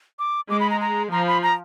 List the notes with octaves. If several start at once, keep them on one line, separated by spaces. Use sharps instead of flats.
D6
G#3 D6
B5
A#5
A#5
F3 A#5
B5
A#5